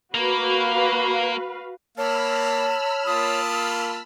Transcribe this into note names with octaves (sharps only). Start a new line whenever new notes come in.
A#3 F#4 A#4 B4 F5
A#3 C#5 F5 A5 B5 E6 F6
A#3 F4 A5 D#6